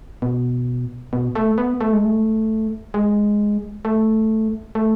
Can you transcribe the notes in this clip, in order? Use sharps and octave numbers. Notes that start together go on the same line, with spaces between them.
B2
B2
A3
B3
A3
G#3
A3
G#3
A3
A3